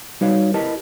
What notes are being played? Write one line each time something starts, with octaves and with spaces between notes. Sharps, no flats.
G3 D#4 F#4 B4 C#5 F5
E4 G4 A#4 B4 D#5 A5